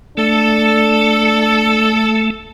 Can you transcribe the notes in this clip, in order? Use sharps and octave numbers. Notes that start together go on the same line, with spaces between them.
A3 D4 A4